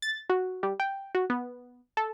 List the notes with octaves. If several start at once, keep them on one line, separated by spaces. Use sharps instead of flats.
A6
F#4
G3
G5
F#4
B3
A4